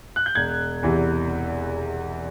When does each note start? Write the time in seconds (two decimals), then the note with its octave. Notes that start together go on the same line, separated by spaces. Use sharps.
0.16 F#6
0.26 G6
0.35 E1 G#6
0.83 E2 C3 E3